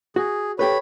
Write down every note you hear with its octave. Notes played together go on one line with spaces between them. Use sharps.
F#4 G#4
G4 A4 B4 C#5 B5